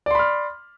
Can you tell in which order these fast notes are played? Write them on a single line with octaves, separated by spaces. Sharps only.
D5 C6 B5 F6